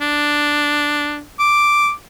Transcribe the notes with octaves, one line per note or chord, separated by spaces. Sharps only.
D4
D6